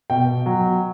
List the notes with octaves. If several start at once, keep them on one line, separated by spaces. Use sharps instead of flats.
B2 G5
F#3